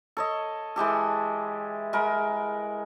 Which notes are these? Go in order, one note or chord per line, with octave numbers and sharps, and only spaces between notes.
A4 C#5 D#5
E3 G#3 G4 A4
G#3 A#4 F#5 B5